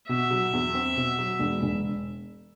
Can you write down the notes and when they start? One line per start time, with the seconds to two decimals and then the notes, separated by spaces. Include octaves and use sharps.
0.09 B2 E5
0.31 F#3
0.53 E2
0.74 C4
0.97 B2
1.19 F#3
1.39 E1
1.62 E1